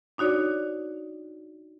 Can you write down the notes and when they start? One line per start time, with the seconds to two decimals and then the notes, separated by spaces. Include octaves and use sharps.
0.18 D4 D#4 F#4 C#5 D5